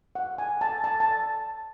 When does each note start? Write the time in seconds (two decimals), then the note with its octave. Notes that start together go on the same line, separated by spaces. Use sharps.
0.15 F#5
0.38 G#5
0.61 A5
0.84 A5
1.00 A5